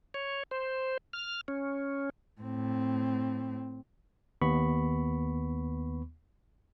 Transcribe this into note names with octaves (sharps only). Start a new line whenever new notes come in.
C#5
C5
F6
C#4
A2 C4
D#2 B3 B5 C#6